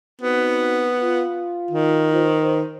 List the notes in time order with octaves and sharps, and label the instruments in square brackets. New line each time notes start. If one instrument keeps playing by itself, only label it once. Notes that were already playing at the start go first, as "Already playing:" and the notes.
[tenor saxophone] B3 [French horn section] C4 D#4 F#4
[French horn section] F4
[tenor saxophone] D#3
[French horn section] C5